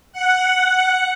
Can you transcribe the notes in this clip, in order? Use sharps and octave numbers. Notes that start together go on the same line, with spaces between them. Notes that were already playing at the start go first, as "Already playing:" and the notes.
F#5